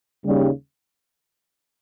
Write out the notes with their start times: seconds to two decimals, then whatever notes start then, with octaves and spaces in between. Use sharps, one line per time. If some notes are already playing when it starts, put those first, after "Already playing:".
0.25 D#2 C#3 G3